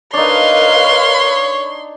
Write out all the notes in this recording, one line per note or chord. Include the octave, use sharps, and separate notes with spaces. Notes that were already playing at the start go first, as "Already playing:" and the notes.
D4 D#4 A#4 B4 C#5 F5 C6